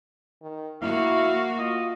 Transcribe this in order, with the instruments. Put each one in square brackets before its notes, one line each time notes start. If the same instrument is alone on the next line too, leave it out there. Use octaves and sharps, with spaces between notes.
[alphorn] D#3
[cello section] A#3 F#4 [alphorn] E4 [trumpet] F5
[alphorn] F4 [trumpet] D#5